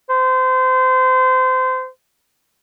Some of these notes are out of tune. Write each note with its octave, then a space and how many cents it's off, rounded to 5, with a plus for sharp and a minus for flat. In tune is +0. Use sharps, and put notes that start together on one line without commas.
C5 -25